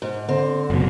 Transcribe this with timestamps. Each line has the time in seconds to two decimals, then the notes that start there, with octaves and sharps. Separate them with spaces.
0.02 G#2
0.29 D3 C4
0.70 F#1 B2